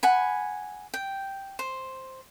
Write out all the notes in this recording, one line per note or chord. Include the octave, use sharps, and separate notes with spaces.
F#5 G#5 B5
G5
C5